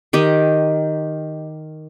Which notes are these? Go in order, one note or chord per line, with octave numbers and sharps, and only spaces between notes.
D#3 G4 D#5